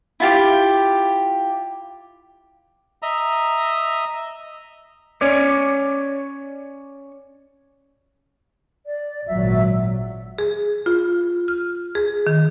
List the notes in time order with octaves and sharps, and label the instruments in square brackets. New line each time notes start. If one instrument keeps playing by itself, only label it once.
[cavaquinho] E4 F4 G4
[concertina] D#5 E5 A#5
[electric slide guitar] C#4 C#5 D5
[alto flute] D5
[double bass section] G#1 A#2 F#3 [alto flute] E5
[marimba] G#4
F4
F6
G#4
D#3